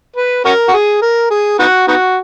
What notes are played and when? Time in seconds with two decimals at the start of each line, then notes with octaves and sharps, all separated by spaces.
0.16 B4
0.45 C#4 F#4 A#4
0.69 F#4
0.73 G#4
1.02 A#4
1.31 G#4
1.59 B3 D#4 F#4
1.88 B3 D#4 F#4